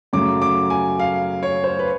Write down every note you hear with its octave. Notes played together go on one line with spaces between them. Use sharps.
F#2 C#3 F#3 A3 D6
D6
G#5
F5
C#5
C5
B4